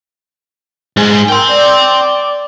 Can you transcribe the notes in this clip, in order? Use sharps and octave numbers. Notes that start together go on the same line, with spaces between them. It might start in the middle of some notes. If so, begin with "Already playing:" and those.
G#2 G#4
A#4 G5 C6
D5